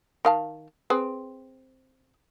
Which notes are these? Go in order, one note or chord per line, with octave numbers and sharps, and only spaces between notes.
D#3 F5 A5
C4 G#4 B4